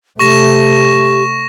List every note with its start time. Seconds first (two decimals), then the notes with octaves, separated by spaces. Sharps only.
0.19 C3 A3 G4 C#6 A#6 E7